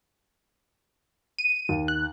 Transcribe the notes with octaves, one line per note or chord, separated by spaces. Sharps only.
D#7
D#2
F#6